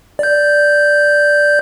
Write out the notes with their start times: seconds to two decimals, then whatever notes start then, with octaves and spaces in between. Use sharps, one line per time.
0.19 D5 G6